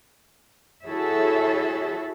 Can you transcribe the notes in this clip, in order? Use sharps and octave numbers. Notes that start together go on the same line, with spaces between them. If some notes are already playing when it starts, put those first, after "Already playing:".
E4 F#4 G#4 A4 C#5 E5